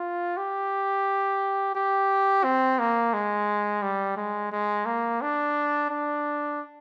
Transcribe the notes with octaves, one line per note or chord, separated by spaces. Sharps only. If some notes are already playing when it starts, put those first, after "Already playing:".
Already playing: F4
G4
G4
C4
A#3
G#3
G3
G#3
G#3
A#3
D4
D4